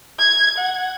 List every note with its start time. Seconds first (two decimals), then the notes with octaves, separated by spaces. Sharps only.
0.19 G#6
0.58 F#5